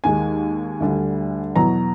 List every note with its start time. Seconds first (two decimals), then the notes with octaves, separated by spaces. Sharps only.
0.04 D#2 D#3 G#3 G#5
0.80 D2 D3 G3
1.55 E2 B2 F#3 A#5